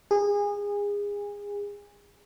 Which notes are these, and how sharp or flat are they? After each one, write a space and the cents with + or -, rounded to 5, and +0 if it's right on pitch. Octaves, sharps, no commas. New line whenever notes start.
G#4 -25